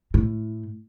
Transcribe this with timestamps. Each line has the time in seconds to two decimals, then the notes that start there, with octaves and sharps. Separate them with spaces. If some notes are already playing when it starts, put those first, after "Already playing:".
0.14 A2